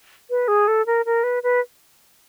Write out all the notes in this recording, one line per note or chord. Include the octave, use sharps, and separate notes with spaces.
B4
G#4
A4
A#4
A#4
B4
B4